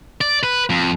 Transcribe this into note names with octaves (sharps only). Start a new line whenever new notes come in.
D5
B4
F2